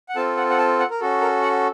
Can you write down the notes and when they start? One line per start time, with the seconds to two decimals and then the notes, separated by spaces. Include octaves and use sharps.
0.09 F#5
0.16 C4 F4 A4 A5
0.37 F#5
0.50 F#5
0.58 A5
0.79 F#5
0.90 A#4
1.00 C#4 F#4 A4
1.21 A#4
1.42 F#5